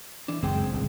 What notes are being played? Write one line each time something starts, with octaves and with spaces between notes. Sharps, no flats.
E3 D4
F#1 C#2 F#2 C4 G#4 G5
D1 C2 C#3